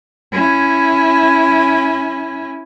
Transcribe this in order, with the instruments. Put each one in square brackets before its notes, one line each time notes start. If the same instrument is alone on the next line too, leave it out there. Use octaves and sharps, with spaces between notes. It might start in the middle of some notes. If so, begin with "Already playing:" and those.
[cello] C#4 E4